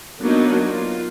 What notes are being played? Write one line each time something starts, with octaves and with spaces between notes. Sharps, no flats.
F#3 A#3 B3 D4 D#4
F4